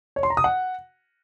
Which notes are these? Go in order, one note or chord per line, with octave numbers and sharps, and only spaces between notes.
C#5
C6
A#5
D#6
F#5